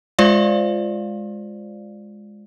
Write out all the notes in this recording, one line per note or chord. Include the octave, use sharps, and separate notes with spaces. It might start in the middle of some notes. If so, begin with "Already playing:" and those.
G#3 F4 C5 D5 F5